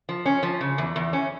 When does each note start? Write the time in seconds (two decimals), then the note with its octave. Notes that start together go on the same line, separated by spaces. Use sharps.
0.09 F3
0.26 C#4
0.43 F3
0.61 C#3
0.78 E2
0.96 E2
1.13 C#4